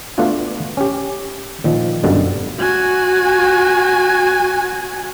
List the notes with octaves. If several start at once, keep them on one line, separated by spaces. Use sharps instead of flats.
A3 B3 D4 F4 F#4
C#4 G4
A#2 D#3 F3
G1 F#2 B2 D3 G3
F#4 G#5